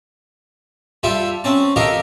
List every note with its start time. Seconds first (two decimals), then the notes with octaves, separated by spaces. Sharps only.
1.03 G3 F4 A4 E5 G5
1.44 C4 C#4 A5
1.76 G4 A4 A#4 D#5 F5